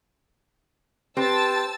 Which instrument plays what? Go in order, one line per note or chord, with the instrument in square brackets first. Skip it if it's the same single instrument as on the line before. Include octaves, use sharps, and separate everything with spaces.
[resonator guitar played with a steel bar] C4 [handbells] G4 B4 [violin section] A5 E6 A6